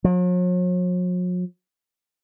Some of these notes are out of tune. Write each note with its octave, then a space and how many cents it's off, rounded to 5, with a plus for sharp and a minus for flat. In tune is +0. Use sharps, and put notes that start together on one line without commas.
F#3 -45